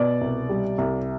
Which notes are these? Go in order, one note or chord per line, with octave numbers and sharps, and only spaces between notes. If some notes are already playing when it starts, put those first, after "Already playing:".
Already playing: B2 D5
C2
G3
C2